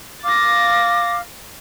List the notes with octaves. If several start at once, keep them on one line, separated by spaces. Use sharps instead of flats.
F5 D6 A6 A#6